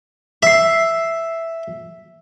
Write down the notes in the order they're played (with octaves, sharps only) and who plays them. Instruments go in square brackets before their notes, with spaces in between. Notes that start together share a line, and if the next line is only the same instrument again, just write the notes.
[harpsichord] E5 [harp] E6 C7